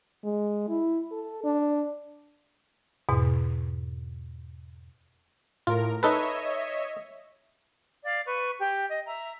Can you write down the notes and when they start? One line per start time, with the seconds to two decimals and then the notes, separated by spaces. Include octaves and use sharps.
0.24 G#3
0.69 E4
1.12 A4
1.44 D4
3.09 E2 G#2 B2
5.67 A2 F4 A#4
6.03 D#4 A4 B4 C#5 D#5 E5
8.04 D5 F5
8.26 B4 C#6
8.60 G4 G5
8.88 D#5
9.06 E5 A#5